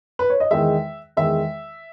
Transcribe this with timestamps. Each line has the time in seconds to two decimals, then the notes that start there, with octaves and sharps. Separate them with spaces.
0.19 B4
0.30 C#5
0.40 D#5
0.51 E2 D#3 G#3 E5
1.17 E2 D#3 G#3 E5